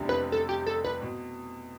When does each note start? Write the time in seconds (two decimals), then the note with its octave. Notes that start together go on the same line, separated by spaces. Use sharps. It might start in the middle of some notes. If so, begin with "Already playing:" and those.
Already playing: F1 E2 C3 G3 D4
0.09 B4
0.32 A4
0.49 G4
0.67 A4
0.84 B4
1.02 B2